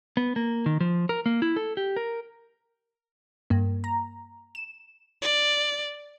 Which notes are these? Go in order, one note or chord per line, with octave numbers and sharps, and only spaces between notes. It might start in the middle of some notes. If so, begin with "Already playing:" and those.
B3
A#3
D#3
F3
A#4
A#3
E4
A4
G4
A#4
G2 A#3
A#5
E7
D5